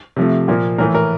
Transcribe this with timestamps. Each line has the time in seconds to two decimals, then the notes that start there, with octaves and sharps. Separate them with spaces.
0.16 C3 F3 A3
0.48 A#2 F3 A#3
0.78 A2 E3 A3 A#4
0.95 A#4